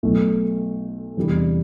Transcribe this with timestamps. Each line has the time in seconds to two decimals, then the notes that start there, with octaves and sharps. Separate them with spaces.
0.03 B1 B2 A3
1.17 E2 C3 G3 D4